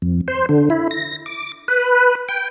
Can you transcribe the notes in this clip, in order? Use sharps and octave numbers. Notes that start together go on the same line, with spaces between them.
F2
C5
D3
E4
A#6
D6
B4
G5